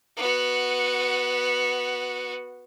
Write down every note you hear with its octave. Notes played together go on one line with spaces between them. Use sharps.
B3 F#4